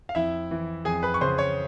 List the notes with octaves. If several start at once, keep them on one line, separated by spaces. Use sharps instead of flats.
F5
F2 E4 E5
E3
F2 G#4 G#5
B4 B5
C#6
C#3 C5 C6
C#5 C#6